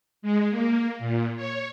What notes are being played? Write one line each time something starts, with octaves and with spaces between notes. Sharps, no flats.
G#3
A#3
A#2
C#5